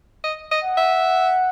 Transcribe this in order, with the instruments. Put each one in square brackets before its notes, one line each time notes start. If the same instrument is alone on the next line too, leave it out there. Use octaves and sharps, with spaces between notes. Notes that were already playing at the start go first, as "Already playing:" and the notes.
[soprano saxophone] D#5
D#5
[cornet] F#5
[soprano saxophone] E5